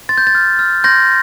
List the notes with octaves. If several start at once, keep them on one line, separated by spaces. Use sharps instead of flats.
C6 A6
G6
A6
F6
F6
C6 G6 A#6